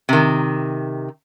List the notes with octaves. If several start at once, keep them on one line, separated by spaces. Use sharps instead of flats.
C3 D#3